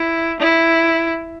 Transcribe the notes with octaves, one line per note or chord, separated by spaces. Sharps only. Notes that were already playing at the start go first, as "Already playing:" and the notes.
Already playing: E4
E4